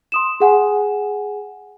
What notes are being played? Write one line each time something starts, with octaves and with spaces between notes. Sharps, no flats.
C6 D#6 E7
G#4 F#5 G#5